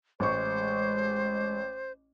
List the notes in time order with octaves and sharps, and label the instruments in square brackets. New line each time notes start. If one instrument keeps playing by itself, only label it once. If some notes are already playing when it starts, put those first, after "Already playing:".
[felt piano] A1 C#6 [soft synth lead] G#3 [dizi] C5